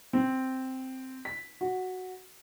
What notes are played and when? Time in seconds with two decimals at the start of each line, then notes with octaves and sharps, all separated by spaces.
0.13 C4
1.25 B6
1.61 F#4